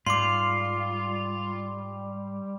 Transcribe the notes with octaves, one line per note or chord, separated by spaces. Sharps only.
G#2 G3 F4 C6 D6